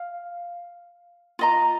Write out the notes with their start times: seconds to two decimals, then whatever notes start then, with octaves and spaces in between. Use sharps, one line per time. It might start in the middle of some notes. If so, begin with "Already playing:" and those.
Already playing: F5
1.39 F4 D#5 A#5